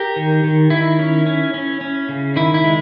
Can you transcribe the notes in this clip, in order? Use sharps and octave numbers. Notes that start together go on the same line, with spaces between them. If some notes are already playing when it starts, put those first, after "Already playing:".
Already playing: G4 A#4
D#3
D#3
D#3 E4
C#4
C#4
C#4
C#4
C#3
D#3 E4
E4
G#3